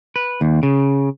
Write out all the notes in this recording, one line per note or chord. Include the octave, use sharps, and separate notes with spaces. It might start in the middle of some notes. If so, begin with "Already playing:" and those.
B4
D#2
C#3